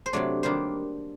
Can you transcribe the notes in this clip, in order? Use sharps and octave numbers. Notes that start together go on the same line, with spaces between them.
C5
C3 F#3 A3 D4 D5
D#3 G3 A#3 D4 C5